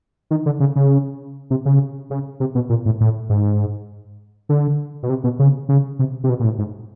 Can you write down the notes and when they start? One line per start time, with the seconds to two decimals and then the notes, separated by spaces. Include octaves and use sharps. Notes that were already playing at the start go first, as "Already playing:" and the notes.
0.31 D#3
0.46 D3
0.60 C#3
0.76 C#3
1.50 C3
1.65 C#3
2.10 C#3
2.40 C3
2.55 B2
2.69 A#2
2.85 A2
3.00 A2
3.30 G#2
4.49 D3
5.03 B2
5.09 C3
5.24 B2
5.39 C#3
5.69 C#3
5.99 C3
6.24 C3
6.29 B2
6.40 A#2
6.44 A2
6.59 G#2